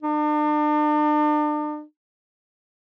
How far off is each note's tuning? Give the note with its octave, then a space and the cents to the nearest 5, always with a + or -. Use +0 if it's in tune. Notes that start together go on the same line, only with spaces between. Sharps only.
D4 +40